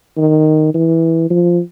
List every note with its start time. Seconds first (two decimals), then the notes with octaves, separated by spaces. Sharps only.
0.17 D#3
0.74 E3
1.30 F3